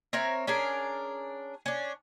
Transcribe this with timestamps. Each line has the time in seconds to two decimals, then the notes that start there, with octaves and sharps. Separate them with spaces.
0.13 C4 A#4 C#5 E5
0.47 C#4 D4 G#4 A#4
1.66 C#4 D4